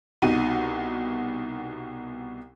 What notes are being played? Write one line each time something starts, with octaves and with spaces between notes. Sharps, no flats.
C2 B2 D#4 F#4 D#7